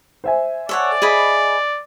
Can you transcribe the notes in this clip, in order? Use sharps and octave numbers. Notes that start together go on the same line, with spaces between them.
C5 E5 G#5
A4 C#5 D5 F#5
G#4 D#5 B5